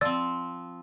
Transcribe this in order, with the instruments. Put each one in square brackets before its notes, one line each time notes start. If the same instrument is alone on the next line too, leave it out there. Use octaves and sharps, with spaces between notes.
[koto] F3 C4 [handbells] D5 E6 A6